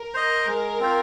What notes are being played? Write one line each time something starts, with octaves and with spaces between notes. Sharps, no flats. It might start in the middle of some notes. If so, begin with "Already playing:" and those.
Already playing: A#4
C5 D#5
G#3
C4 F4 C5